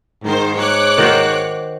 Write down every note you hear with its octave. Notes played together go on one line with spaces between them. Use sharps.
G#2 D#3 C5
C#5 D6 F#6
D#3 F#4 C5